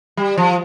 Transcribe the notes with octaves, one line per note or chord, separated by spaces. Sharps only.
G3
F3